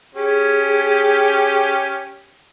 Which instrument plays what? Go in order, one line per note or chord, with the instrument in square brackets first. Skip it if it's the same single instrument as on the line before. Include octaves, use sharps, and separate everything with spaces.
[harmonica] C#4 G4 [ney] G#4